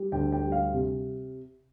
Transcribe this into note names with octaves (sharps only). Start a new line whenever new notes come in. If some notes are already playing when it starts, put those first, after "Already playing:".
Already playing: G3
D2 G5
G5
G3
F5
C3